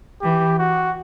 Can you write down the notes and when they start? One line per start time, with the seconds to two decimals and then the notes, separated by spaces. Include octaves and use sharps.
0.22 E3 G4
0.58 F#4